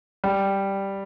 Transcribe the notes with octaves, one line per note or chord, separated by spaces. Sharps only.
G3